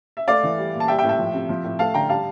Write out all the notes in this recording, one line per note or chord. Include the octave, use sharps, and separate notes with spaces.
E5
A3 D5 F5
E3
G3
A#2
A5
G3 E5 G5
E5 G5
A2
E5 G5
F3
C3
F3
A2
A3 F5 A5
D3 G5 A#5
G3 F5 A5